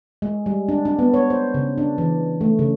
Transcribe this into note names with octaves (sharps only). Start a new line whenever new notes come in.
G#3
G3
D4
D4
B3
C#5
C5
C#3
D4
E3
A3
C#3